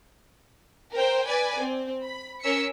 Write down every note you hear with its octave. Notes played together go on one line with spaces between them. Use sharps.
A#4 C5 G5
B4 D5 G#5
C4
B5
C#4 A#4 E6 B6 C#7